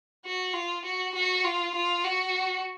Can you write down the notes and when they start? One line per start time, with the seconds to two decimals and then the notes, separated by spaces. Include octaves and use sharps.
0.25 F#4
0.54 F4
0.85 F#4
1.15 F#4
1.44 F4
1.75 F4
2.04 F#4